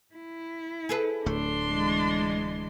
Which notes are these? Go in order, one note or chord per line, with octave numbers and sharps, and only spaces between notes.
E4
G#4 A4 B4
D1 A3 D4 C6
E3 G#3